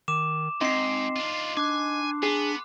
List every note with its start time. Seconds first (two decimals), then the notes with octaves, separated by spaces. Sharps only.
0.08 D#3 D6 E7
0.61 G#2 C4 D#4 C6 C7
1.16 D4 F4
1.57 D4 G#5 D6 F#6
2.23 B3 G#4